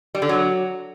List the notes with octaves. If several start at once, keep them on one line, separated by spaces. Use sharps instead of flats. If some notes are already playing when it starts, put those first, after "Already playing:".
G3
D3
F#3